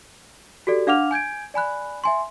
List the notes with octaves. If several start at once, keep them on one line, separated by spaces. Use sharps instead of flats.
F#4 G4 A4 D5
D4 F5 F#5 D6 F6 F7
G#5 G6 G#6 D7
D5 G#5 B5 F#6
E5 G#5 C6